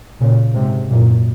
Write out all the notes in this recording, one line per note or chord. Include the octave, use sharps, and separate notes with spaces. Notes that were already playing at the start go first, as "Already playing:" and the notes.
A#2 C#3
G#2 C3
F#2 A#2